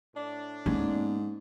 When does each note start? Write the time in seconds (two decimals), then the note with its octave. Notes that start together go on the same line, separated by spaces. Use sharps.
0.15 A2 D4
0.66 G#2 A#3 B3 C#4